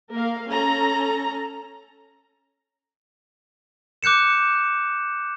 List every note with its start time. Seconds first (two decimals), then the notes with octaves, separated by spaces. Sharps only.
0.12 A#3 A#4 F5
0.50 C#4 A4 A#5
4.03 D6 F#6 G6 C#7 E7